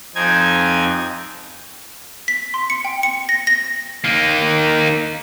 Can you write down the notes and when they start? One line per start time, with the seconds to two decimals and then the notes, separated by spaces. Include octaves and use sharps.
0.15 F2 C4 D#4 G#5 G#6
2.28 B6
2.54 C6
2.70 C#7
2.85 G5
3.03 C#7
3.29 A#6
3.47 A#6
4.04 A#3 D#4